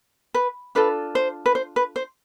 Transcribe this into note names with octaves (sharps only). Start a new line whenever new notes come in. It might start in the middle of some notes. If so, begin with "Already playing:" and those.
B4
D4 F4 A4 B4
C5
B4
C5
B4
C5